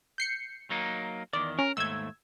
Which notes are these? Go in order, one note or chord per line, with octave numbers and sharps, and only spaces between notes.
G6 C7 C#7
F#3 A#3 D#4
E2 D#3 D5
C#4 A#4
D#2 G#2 A3 E6 G#6